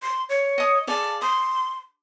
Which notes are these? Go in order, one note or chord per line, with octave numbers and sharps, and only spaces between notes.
C6
C#5
D#5 D#6
G#4 D5 F5 A5
C6 D#6